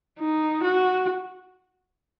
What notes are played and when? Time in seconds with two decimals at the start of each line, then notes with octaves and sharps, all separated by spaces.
0.20 D#4
0.63 F#4